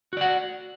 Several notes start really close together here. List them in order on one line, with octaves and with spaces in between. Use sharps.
F#4 D5 F#5